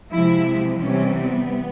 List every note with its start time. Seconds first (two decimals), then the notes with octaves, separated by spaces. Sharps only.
0.11 C3 F3 G#3 E4
0.79 C3 E3 G3 C#4
1.14 B3